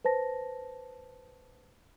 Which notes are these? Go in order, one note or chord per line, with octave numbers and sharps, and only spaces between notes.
B4 C5 A5 A#6